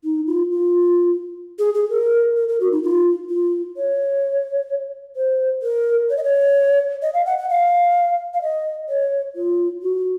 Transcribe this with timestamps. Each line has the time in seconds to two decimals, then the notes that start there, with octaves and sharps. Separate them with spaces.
0.04 D#4
0.27 F4
0.51 F4
1.59 G#4
1.74 G#4
1.90 A#4
2.36 A#4
2.49 A#4
2.60 F#4
2.72 D#4
2.83 F4
3.29 F4
3.77 C#5
5.16 C5
5.62 A#4
6.10 C#5
6.17 D#5
6.24 C#5
7.02 D#5
7.13 F5
7.26 F#5
7.38 F#5
7.49 F5
8.34 F5
8.42 D#5
8.89 C#5
9.36 F4
9.82 F#4